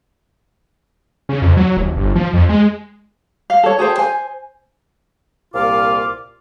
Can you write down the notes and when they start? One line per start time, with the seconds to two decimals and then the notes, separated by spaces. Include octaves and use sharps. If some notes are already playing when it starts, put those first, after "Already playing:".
1.29 C#3
1.42 F2
1.57 F#3
1.77 D#1
1.96 G1
2.16 F3
2.34 F2
2.49 G#3
3.50 F5
3.63 A4 C#5
3.79 G#4 A4 C5 G5
3.98 C5 G#5
5.53 C2 A#2 F4 F5 D6